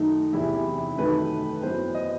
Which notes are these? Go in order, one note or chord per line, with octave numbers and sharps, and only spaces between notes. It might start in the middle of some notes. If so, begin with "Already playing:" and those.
Already playing: F#2 D#3 A3 D#4
E2 C3 E3 E4
F#2 D#3 A3 B4
F#2 E3 B3 C5
D#5